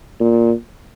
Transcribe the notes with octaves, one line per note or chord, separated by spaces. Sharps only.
A#2